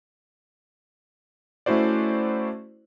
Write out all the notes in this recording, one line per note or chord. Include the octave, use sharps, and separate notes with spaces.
A3 C#4 E4 F#4 C5 D5